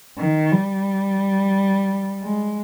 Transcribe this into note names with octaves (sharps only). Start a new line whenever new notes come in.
D#3
G3
G#3